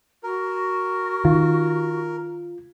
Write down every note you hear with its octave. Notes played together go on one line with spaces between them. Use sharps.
F#4 A#4
D#3 F4